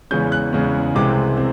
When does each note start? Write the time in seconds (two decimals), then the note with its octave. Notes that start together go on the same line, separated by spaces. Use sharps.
0.11 E2 C#3 E3 G#3 C#4 G6
0.32 F#6
0.53 E2 C#3 E3 G#3 C#4
0.95 C2 C3 E3 G#3 C4 D6
1.37 C4